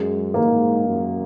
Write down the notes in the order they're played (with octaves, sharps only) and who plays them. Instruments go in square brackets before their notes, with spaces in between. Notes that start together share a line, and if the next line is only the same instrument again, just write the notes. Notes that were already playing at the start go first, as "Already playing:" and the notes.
Already playing: [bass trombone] F#2 [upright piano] G#3
[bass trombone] G#2 [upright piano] A#3
[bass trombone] F#2